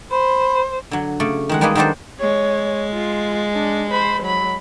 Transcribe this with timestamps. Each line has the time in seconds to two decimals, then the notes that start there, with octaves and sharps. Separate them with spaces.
0.11 C5 B5
0.91 D3 F#3
1.20 C#3 A3 D5
1.49 D#3 G#3 F#5
1.61 G3 G#3 A#3 D#4 G#4 B4
1.75 D#3 F#3 G3 D4 A4 C5
2.19 G#3 C#5
2.94 F4
3.54 D4
3.91 C5 B5
4.23 F#3 B5